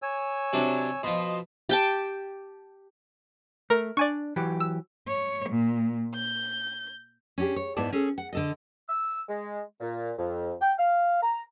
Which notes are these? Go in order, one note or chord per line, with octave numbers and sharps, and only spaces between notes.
C#5 G#5 E6
C3 F#3 D4
B2 F3 D#5 C6
G4 G5 A5
A3 A#4
D4 D5 G#5 C#6
E3 F#3 G4
E6
C#5
A#2
G6
C#4 D4 F4 G4 G#4
C#5
G#2 B3 E4 D5 A5
C#4 G#4 A4
F#5
D3 A4 D#5
E6
G#3
A#2
F2
G5
F5
A#5